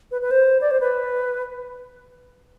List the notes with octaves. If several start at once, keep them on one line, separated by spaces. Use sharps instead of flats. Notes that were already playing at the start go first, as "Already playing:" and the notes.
B4
B4
C5
D5
C5
B4